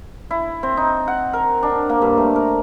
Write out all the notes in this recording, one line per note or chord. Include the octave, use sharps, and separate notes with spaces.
E4
C4
D#4
F#5
A#4
D4
A#3
G2
A3
A#4